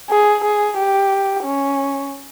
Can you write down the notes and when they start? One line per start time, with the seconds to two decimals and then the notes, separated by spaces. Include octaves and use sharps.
0.10 G#4
0.44 G#4
0.77 G4
1.44 C#4